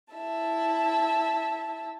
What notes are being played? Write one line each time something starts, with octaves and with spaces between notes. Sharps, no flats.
E4 E5 A5